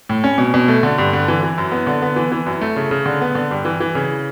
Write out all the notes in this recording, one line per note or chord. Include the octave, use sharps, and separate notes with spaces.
A2
C#4
B2
B2
A3
D3
G2
D3
E3
E3
F#2
B3
D3
B3
E3
E3
F#2
A3
C#3
C#3
D3
B3
D3
G2
E3
E3
C#3